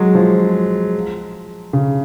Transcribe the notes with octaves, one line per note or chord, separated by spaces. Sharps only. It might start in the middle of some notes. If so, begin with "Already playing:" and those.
Already playing: F#3 G#3
F3
C#3